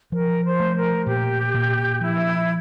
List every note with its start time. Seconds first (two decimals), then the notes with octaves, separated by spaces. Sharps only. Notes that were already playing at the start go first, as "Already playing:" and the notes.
0.12 F3 A#4
0.45 C5
0.60 A3
0.76 A#4
1.07 A#2 G4
1.54 A#2
2.01 F3 E4